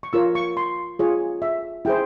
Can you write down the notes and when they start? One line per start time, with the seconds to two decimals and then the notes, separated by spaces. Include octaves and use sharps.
0.03 C#6
0.13 F4 A#4 C#5 E6
0.35 C#6
0.57 C6
0.99 F4 G#4 C#5
1.42 E5
1.85 E4 G#4 C5 G5